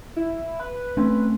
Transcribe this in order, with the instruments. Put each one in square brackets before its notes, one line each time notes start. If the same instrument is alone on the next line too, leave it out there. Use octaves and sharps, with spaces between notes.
[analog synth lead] E4
B4
[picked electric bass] A3 C4 C#4